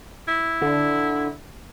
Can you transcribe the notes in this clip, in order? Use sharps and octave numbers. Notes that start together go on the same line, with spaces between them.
E4
D3